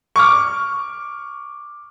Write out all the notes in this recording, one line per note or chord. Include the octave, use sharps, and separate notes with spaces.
C#6 D6 F6